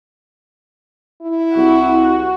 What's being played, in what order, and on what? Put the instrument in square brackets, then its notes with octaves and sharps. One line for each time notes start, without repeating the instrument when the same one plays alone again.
[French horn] E4
[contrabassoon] C2 [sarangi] F#4